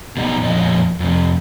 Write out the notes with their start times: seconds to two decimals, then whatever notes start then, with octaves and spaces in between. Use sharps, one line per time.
0.17 B2 G3 D#4
0.41 F2 A#2 F3 C#4 D#5
1.00 F2 C3